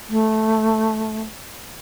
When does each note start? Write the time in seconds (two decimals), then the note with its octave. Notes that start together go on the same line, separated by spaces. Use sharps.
0.09 A3